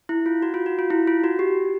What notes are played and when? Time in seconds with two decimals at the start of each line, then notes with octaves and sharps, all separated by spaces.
0.09 E4
0.26 F4
0.42 F#4
0.54 F4
0.66 F#4
0.79 F4
0.90 E4
1.08 F4
1.24 F#4
1.39 G4